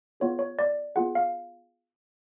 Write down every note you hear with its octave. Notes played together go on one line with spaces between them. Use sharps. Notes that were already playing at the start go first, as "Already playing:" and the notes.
B3 F4 G#4 C#5
C#5
D5
B3 F4 G#4 F#5
F5